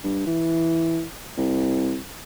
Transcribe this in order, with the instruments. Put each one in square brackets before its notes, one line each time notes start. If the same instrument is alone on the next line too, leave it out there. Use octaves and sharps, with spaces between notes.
[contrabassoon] G2
E3
C2